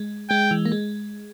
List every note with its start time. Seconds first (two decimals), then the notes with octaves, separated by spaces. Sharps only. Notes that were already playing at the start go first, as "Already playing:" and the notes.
Already playing: G#3
0.30 G#3 G5
0.51 E3
0.65 A#3
0.72 G#3